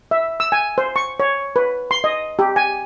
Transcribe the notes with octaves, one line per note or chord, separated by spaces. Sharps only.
E5
E6
G#5
C5
C#6
C#5
B4
C6
D#5
G4
G#5